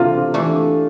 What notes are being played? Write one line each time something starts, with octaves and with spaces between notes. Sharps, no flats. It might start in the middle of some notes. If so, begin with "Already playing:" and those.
Already playing: C3 E3 A3 D4 F4
E3 A3 D4